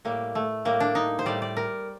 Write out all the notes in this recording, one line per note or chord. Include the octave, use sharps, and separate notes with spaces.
A2 G3 A#3
A3
A2 G3 A#3
D4
D#4
C5
A2 G3 D5
D5
A#4